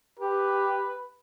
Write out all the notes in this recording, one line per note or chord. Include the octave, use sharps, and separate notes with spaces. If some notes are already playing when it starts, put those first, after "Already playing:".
G4 B4